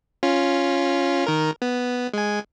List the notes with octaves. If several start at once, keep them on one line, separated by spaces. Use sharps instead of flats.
C#4 F4
D#3 A#4
B3
G#3 G#5